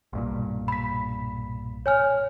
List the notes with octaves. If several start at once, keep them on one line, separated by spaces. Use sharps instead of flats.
B1 G2 A#2
B5 B6
C#5 G#5 F6